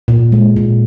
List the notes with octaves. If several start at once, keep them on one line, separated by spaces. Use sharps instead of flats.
A#2
G#3
A#2